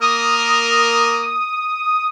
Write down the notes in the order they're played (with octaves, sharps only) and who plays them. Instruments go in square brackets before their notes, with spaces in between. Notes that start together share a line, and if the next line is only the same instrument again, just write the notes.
[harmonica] A#3 A#4 [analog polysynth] D#6